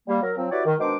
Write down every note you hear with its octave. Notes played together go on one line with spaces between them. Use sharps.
G3 A#3
F#3 A#4
F3 F#3 C4
E4 F#4 G4 B4 C#5 D5
D#3
B2 D#3 G#3 D4 C5 D6